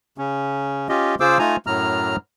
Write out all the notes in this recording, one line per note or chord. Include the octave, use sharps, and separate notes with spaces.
C#3 C#4
C#4 F4 G4 D#5
C#3 F4 G#4 C5 D6 E6
A3 D#4 F4 G#5 A#5
F#2 A2 F#3 A#5 F6